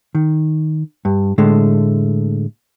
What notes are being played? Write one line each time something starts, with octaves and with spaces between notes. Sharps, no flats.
D#3
G2
A2 D3 G#3 A3